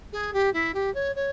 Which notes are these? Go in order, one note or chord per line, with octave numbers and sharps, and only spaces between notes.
G#4
G4
E4
G4
C#5
C#5